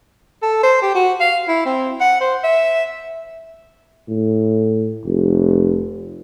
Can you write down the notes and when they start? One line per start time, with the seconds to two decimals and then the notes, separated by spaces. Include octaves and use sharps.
0.42 A4
0.63 C5
0.82 G4
0.95 F#4
1.20 F5
1.48 E4
1.66 C4
2.01 F#5
2.21 C5
2.44 E5
4.09 A2
5.06 F1